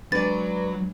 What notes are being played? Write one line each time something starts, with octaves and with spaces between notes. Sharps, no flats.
F#3 G#3 D4 B4 D5 A6